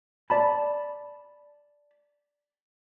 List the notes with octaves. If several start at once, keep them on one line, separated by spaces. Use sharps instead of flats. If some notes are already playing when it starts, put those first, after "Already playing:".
D5 A5 B5